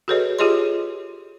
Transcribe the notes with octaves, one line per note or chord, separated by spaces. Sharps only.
F#4 G#4 A4 B4 C#5 D#5
F4 G4 G#4 C#5 D#5 C6